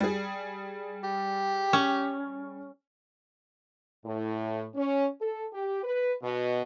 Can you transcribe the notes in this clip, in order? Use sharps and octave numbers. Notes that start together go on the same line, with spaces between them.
G3 G#4
G4
C#4
A2
C#4
A4
G4
B4
B2